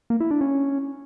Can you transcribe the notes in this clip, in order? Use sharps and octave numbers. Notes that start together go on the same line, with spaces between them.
A#3
E4
D4
C#4